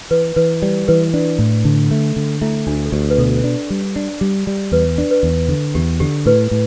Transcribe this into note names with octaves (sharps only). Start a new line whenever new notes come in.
E3 B4
E3 B4
G3 D5
E3 B4
D4
A2
D3
A3
D3
A3 E4
D2 D4
A4
D2 G4
B4
B2 A4
D4
G3
D4
G3
G3
E2 B4
D4
B4
E2
D3
E2 G4
D3 G4
A2 B4
A2